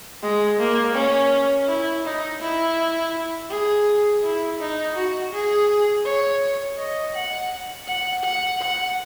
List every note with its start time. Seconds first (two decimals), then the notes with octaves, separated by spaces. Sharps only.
0.22 G#3
0.59 A#3
0.94 C#4
1.67 E4
2.04 D#4
2.40 E4
3.49 G#4
4.23 E4
4.60 D#4
4.95 F#4
5.32 G#4
6.05 C#5
6.78 D#5
7.14 F#5
7.87 F#5
8.23 F#5
8.61 F#5